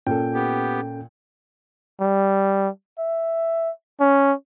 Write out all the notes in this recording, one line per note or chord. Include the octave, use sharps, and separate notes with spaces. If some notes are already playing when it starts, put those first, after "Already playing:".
A#2 C#4 A4 G5
B3 G4
G3
E5
C#4